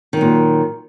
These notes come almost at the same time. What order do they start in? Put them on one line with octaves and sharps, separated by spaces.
D#3 F#3 A#2